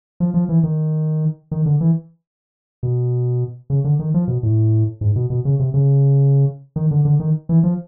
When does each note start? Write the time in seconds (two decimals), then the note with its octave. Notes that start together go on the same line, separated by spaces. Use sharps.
0.20 F3
0.34 F3
0.49 E3
0.64 D#3
1.51 D#3
1.66 D3
1.81 E3
2.83 B2
3.70 C#3
3.84 D3
3.99 D#3
4.14 F3
4.28 B2
4.43 A2
5.01 G#2
5.16 B2
5.30 B2
5.45 C#3
5.59 C3
5.74 C#3
6.76 D#3
6.91 D3
7.05 D3
7.20 D#3
7.49 E3
7.64 F3